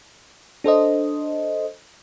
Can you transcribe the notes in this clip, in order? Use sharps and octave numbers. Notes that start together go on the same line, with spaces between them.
D4 A4 C5 D#5